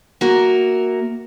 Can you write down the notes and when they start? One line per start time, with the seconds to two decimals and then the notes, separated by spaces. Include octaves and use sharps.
0.21 A#3 F#4 A#4 E5